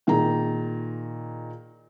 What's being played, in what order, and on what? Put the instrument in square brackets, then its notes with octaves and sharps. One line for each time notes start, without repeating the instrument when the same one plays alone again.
[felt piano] A#2 D#3 G#4 A#5